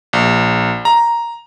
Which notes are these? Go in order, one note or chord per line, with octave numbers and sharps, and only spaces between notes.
A#1
A#5